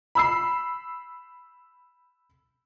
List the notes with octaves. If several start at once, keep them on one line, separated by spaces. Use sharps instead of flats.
B5 E6 C7